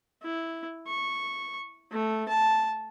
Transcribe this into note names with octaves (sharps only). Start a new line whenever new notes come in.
E4
C#6
A3
A5